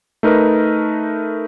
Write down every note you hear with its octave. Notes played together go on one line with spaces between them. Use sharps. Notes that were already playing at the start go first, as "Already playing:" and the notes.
A3 D#4 A#4 B4